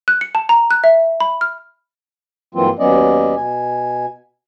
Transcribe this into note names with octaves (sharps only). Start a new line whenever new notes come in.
F#6
C#7
A5
A#5
F#6
E5
B5
F6
G2 E3 F#3 A#3 C4 F4
D#2 F#3 B3 C#4 D5 D#5
B2 G#5